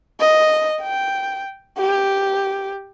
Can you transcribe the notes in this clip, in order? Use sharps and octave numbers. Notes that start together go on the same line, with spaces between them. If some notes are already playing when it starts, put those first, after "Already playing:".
D#5
G5
G4